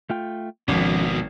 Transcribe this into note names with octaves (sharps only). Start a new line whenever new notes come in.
A3 F4 G5
G#1 F2 B2 F3 C#4